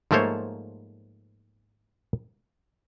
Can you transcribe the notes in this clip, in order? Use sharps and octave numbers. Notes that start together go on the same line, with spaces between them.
G#2 F3 A3 A#3 C5 C#5